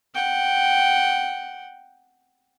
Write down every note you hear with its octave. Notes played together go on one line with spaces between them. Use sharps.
F#5 G5